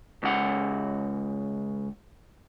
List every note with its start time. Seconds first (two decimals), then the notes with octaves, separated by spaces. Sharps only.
0.23 C#2 F#5